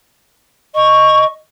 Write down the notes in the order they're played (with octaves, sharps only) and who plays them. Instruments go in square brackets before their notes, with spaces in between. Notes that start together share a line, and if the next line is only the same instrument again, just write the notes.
[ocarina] D#5 [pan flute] C#6